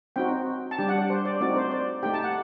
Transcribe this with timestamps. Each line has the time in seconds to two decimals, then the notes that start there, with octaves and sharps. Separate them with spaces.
0.16 C4 D#4 F#4 G5
0.71 A5
0.78 G3 D4 G4 G5
0.89 F#5
0.98 D5
1.10 C5
1.25 D5
1.41 A3 C4 D#4 F#4 D5
1.56 C5
1.71 D5
2.03 A3 D#4 G4 G5
2.14 A5
2.24 F#5